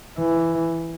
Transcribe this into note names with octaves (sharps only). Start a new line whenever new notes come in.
E3